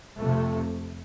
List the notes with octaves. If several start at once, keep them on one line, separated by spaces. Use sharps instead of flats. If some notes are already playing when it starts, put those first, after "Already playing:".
F2 C3 A3